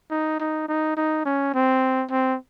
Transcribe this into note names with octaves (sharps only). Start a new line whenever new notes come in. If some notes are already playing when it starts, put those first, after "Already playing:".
D#4
D#4
D#4
D#4
C#4
C4
C4